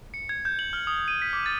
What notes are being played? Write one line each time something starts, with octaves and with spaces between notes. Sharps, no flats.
C#7
G#6
G6
F#7
F6
D#6
D#7
B6
D6
A6